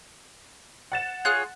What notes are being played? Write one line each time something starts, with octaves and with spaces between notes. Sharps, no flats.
F#5 A6 E7
F4 G#4 C#5 F#6